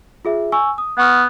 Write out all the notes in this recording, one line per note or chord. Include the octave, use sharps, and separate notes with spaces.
F4 G#4 E5
G#5 C#6 E6
D#6
B3 F#5 C#6 F6